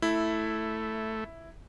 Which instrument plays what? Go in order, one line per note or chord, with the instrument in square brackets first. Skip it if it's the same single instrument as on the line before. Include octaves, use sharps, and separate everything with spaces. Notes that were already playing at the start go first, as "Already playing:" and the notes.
[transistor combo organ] A3 [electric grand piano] E4